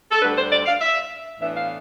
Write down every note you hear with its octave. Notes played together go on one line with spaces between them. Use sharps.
A4
D2 D3 G3 D4 B4
C5
D5
F5
E5
A2 E3 B3 D4 E5
F5